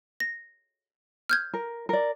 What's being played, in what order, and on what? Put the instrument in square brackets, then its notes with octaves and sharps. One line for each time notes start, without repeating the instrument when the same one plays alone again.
[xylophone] A#6
F6 G6 G#6
[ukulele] A#4
A#4 D5